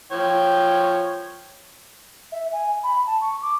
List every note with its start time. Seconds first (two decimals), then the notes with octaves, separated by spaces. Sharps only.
0.12 F3 C#5 G5
2.32 E5
2.52 G#5
2.83 B5
3.07 A5
3.21 C#6
3.42 D6